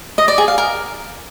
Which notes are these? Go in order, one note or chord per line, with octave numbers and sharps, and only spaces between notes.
D#5
D5
G#4
F5
A#4